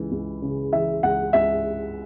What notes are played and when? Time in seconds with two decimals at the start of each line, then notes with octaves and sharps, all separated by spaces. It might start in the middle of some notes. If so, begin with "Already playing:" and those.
Already playing: C#2 C#3 E3
0.12 C#2
0.42 C#3
0.73 E3 E5
1.03 C#2 F#5
1.33 C#2 E5